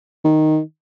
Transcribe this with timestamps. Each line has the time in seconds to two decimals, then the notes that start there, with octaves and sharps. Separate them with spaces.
0.24 D#3